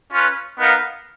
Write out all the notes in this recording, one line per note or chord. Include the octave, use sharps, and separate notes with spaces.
C#4 F4 B4
B3 D#4 A#4 F5